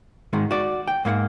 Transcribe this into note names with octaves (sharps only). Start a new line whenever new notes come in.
G#2 D#3 G#3
F#4 D5
G5
G#2 A#3 B4 F#5